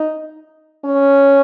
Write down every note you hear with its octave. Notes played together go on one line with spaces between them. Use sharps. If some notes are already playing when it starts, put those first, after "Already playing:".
Already playing: D#4
C#4